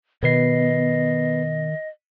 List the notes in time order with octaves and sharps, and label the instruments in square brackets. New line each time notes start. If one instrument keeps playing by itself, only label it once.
[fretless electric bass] B2 [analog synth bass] D#3 [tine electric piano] B3 B4 C7 [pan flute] D#5